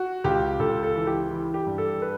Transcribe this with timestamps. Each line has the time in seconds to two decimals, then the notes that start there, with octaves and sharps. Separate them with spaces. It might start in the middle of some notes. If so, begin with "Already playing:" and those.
Already playing: F#4
0.24 C#2 G4
0.60 C#2 A4
0.83 A4
0.95 E3
1.07 G4
1.31 E3
1.54 G4
1.66 G2
1.78 A4
2.02 B4